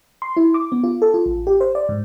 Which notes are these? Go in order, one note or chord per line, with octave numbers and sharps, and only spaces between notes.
C6
E4
D6
B3
F4
A4
F4
A1
G4
C5
D5
G#2